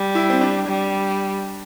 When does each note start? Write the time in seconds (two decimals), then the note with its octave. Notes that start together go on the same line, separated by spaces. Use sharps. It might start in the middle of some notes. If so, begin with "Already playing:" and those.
Already playing: G3
0.15 E4
0.30 C4
0.41 D4
0.67 G3